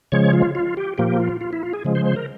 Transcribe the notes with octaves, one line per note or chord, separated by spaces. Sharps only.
C#3 F3 G#3 C#5
F4
F4
G4
A#2 F3 A#3 G4
F4
F4
E4
F4
G#4
C#3 F3 G#3
C5
C5
A#4